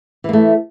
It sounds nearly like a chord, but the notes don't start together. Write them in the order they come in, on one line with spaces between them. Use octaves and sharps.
E3 A#3 A3